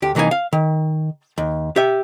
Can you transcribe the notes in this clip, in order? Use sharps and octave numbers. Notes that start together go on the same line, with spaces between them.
D2 G4
C2 E3 A#3 D#4 G#5
F5
D#3
D#2
G4 E5